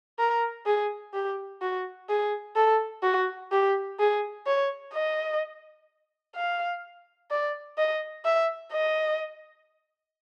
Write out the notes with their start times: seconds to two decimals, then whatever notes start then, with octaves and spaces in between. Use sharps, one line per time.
0.19 A#4
0.66 G#4
1.14 G4
1.62 F#4
2.10 G#4
2.56 A4
3.03 F#4
3.52 G4
3.99 G#4
4.47 C#5
4.94 D#5
6.36 F5
7.31 D5
7.78 D#5
8.25 E5
8.73 D#5